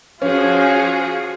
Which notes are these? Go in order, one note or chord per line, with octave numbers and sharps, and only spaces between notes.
F3 C#4 F#4 G#4 F5